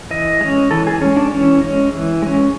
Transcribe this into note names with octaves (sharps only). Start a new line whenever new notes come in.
E3 D#5
G#3 C#4
E3 A4
G#4
G#3 C#4
D4
E3 C#4
G#3 C#4
E3
G#3 C#4